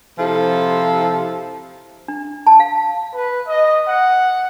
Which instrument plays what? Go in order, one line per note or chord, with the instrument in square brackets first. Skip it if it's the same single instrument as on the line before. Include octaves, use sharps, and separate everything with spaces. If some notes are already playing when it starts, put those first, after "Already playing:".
[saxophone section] C3 F3 E4 A4
[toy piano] D4
A5
F5
[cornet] B4
D#5
F#5